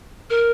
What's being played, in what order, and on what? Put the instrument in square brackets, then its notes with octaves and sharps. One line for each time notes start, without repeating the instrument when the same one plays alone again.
[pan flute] A#4